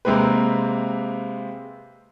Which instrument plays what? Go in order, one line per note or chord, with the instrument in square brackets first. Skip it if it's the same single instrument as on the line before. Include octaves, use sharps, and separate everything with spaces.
[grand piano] C3 G#3 A#3 C4 B4